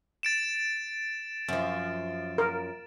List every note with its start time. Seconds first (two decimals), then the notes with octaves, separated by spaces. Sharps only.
0.23 A6 D7 E7
1.48 F#2 F3
2.38 A#4